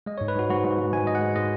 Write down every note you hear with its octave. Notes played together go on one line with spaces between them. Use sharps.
G#3 D#5
G#2 C#5
B4
G#2 F#4
G#2 F#4
G#2
G#2
G#2 G#5
G#2 D#5
F#5
G#3
G#3 D#5